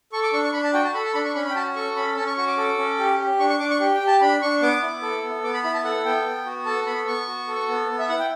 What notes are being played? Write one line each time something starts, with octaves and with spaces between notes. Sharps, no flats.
A4 C#6
D6
D4 C#6
C#6
D4 B5
A5
F#4 G5
A5
A4 B5
A5
D4 B5
C#6
C#4 B5
B5
G5
F#4 A5
A4 C#6
C#4 B5
C#4 A5
C#6
F#4 C#6
D6
A4 D6
C#4
G4
G4
D4 C#6
C#6
D4 D6
C#6
G4
G5
G4
A5
D4 B5
D4 C#6
B3 D6
E4
A4
B3
B3 D6
B5
E4 B5
A5
A4 F#5
B3 G5
B3
F#4
A4 A5
B3 B5
B3 C#6
F#4
A4
B3
B3
E5
E4 F#5
G5